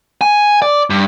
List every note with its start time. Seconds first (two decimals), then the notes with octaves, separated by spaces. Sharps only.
0.21 G#5
0.62 D5
0.90 G2